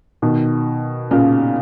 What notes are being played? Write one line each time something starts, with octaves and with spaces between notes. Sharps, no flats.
B2 D#3
A#2 C#3